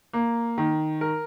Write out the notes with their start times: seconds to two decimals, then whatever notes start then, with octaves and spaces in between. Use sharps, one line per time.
0.13 A#3
0.58 D#3
1.01 A#4